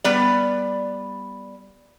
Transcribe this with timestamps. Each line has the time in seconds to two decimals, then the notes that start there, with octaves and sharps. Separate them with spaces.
0.04 G3 B3 D5